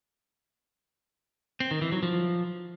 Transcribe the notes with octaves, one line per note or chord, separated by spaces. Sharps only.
C4
D#3
E3
F#3
F3